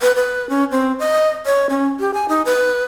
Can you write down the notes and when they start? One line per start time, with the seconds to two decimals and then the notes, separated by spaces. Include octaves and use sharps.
0.01 B4
0.16 B4
0.50 C#4
0.71 C4
0.99 D#5
1.46 C#5
1.70 C#4
2.00 G4
2.14 G#5
2.29 D#4
2.45 B4